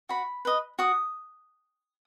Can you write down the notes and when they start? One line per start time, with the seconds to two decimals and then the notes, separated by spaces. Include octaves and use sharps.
0.09 F#4 B5
0.45 B4 D#5
0.79 F#4 D#6